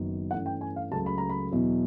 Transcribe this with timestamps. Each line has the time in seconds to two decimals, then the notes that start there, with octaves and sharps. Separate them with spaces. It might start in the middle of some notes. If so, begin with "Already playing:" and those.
Already playing: F#1 F#2 D#3 F#3 B3
0.31 G2 E3 A3 C#4 F#5
0.46 G5
0.61 G#5
0.76 F5
0.91 C#2 C#3 F#3 A3 A5
1.06 B5
1.18 A#5
1.29 B5
1.51 E2 B2 F#3